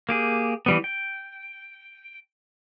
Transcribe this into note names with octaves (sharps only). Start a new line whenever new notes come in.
A#3 G4 G#4
E3 G3 B3
G5